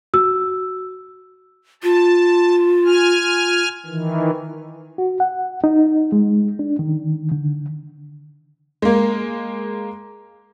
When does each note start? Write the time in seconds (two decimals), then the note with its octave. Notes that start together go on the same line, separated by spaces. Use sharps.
0.14 F#4 E6
1.83 F4 A5
2.85 G#5 F6
3.86 D#3 E3
4.98 F#4
5.20 F#5
5.64 D#4
6.12 G#3
6.59 D4
6.79 D#3
7.32 D3
8.82 G#3 A#3